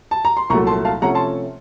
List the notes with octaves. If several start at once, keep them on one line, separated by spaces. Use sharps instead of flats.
A5
A#5
C6
C2 A#2 F#3 A3 A#5 C#6
A5 C6
F5 A5
C3 F3 A3 C#4 F#5 A#5
A5 C6